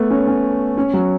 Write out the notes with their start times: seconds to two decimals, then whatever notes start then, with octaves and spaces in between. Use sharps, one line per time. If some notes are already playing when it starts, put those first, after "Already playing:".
Already playing: A3 B3
0.10 C#4
0.27 C#4
0.77 C#4
0.94 F#3